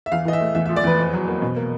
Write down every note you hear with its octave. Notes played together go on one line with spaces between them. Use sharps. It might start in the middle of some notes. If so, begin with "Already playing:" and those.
E5
E2 F5
E3 D#5
E5
A3
E2 E5
E5
F3
D5
E2 B4
F2
F#3
A#3
B2
A#3